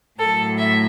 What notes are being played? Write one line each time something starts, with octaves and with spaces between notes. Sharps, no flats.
A2 F#3 A3 A4
E5